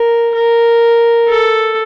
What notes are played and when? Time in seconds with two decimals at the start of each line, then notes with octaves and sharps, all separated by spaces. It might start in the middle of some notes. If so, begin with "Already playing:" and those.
Already playing: A#4
0.34 A#4
1.28 A4